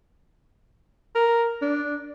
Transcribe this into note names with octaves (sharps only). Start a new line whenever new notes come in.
A#4
D4